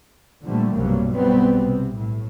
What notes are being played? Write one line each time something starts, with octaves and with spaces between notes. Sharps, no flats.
A#2 D3 F3 G3 A3
B1 G2 C3 F#3 G3 A#3
B1 F#3 G3 B3 C4
C3
A2